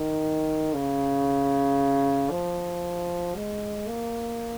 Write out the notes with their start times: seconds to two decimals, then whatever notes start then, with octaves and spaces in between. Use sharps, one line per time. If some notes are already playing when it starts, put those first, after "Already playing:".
Already playing: D#3
0.74 C#3
2.31 F3
3.36 G#3
3.88 A#3